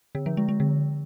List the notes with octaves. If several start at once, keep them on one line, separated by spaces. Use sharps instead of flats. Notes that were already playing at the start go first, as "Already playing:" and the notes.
D3
F3
G#3
G#3
D3